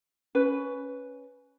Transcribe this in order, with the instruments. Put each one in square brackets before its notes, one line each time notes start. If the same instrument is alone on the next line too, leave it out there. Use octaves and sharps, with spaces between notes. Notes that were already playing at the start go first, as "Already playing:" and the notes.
[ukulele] C#4 B4